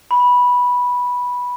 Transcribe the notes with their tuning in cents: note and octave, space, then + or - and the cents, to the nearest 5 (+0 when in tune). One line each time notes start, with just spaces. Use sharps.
B5 -10